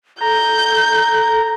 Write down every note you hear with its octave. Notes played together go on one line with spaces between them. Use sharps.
A4 A#5 G6